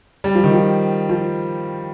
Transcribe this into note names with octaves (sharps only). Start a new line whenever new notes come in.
G3
F3
D#3
F3
F3